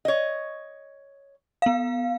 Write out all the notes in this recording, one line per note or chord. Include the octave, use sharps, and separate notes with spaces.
C#5 D#5
B3 F5